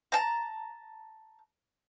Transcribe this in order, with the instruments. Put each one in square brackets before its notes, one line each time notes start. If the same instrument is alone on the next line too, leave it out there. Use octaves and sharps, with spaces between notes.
[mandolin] A5 A#5